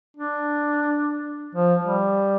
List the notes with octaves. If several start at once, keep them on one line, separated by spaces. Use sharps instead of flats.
D4
F3
G3